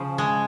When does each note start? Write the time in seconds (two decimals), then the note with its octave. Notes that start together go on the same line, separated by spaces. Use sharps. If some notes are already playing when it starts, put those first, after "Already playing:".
Already playing: C#3 F3
0.18 G#3